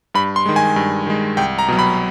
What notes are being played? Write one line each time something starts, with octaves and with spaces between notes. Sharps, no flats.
G2 B5
C6
D#3 G#3
G#5
G2
D#3 G#3
C2 G5
A#5
B2 F#3
B5